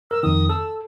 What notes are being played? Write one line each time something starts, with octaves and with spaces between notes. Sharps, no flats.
A#4 E6
F2 D#3 D#6
A4 E6